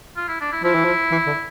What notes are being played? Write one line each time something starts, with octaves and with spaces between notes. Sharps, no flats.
F4
E4
D4
E4
F3 E4
E3
F3
E3
D3